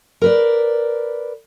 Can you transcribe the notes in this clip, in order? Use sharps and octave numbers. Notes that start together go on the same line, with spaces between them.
A#4 B4 D5